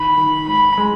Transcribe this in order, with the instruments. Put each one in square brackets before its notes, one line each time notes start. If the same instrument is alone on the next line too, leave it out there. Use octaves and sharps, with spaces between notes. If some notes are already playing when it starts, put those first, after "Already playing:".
Already playing: [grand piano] D#3 [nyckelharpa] B5
[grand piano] D#3
[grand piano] G#2 [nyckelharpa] B5
[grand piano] G#3